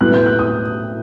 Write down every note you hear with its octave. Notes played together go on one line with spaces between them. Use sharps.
A2 F#3 B3 F#6
G6
F#6
D#6